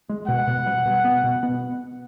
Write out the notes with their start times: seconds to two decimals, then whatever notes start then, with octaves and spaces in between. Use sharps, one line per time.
0.09 G#3
0.28 B2 F#5
0.47 B2
0.66 G3
0.85 B2
1.04 B3
1.24 B2
1.43 B3